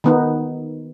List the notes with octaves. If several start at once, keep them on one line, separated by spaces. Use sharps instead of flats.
D#3 B3 D#4